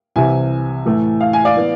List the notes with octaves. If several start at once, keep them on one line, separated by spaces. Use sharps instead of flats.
C2 C3 E3 E5 G#5
A2 E3 A3
F5
G#5
D5 F5
E3 B3